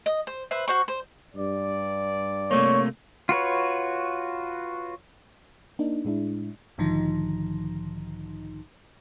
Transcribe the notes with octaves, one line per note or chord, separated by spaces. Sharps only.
D#5
C5
B4 C5 E5
F#4 C5 C#6
C5
G2 D5
C3 A3 A#3 C#5
F4 F#4 B4 C#5
A#3 D4 D#4
A2 G#3 D4 E4
B1 G#2 D3 D#3 F3 D#4